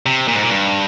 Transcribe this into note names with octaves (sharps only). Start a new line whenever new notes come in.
C3
A#2
G#2
A#2
G2